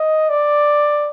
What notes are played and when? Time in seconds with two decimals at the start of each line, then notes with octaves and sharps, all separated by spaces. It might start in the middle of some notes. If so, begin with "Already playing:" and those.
Already playing: D#5
0.29 D5